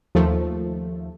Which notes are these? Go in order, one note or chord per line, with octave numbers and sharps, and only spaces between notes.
D#2 F3 A3